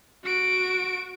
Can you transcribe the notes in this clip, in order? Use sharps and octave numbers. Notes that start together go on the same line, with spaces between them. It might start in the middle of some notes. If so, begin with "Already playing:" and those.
F#4 D7